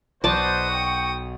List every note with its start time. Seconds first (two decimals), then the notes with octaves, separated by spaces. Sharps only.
0.24 B1 F#4 B4 C5 D5 A5 D#6
0.71 G5 C#6